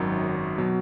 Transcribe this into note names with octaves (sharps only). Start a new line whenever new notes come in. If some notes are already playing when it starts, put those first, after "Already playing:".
Already playing: G#1 F#2 D#3 F#3
B2 F#3